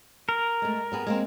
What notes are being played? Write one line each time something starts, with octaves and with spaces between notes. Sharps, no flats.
A#4
G#3 A3
G3 B3 G#4
G#3 A#3 C4